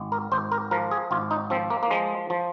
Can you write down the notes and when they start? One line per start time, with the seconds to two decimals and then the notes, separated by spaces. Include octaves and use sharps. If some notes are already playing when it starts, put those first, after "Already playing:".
Already playing: G#1
0.12 A#4
0.32 G#1 C5
0.52 A#4
0.71 F3 A#4
0.91 G#4
1.11 G#1 F4
1.31 D#4
1.50 F3 C4
1.70 A#3
1.83 A#3
1.91 F3 G#3
2.30 F3